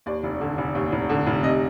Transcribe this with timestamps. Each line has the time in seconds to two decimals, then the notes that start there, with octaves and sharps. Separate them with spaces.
0.06 D#2 D5
0.23 F1
0.41 D3
0.58 F1
0.75 D#2
0.92 F1
1.09 D3
1.27 F1
1.43 C3 D#5